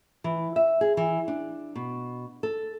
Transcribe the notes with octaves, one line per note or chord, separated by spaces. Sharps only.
E3
E5
G#4
E3
D4
B2
A4